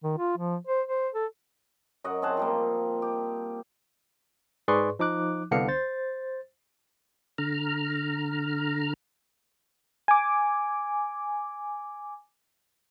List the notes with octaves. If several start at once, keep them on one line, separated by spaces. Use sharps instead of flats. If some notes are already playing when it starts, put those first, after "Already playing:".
D#3
F4
F3
C5
C5
A4
F#2 F#3 D#5 F#5
C4 G#4 F#5 A5
F3 G3 A#3
G4
G#2 G#4 B4 D5 C6 C#6
F3 D#4 D6 F#6
C2 D3 B3 D4 F5 C#7
C5 A6
D3 A#5 F6
G#5 D6